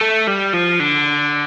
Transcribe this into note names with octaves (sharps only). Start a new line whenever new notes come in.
A3
G3
F3
D3